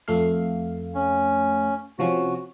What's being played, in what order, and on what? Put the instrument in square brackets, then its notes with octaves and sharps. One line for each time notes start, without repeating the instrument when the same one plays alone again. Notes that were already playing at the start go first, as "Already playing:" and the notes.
[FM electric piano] F2 A3 F5
[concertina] C#4
[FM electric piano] C3 F3 C#4 [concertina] F#4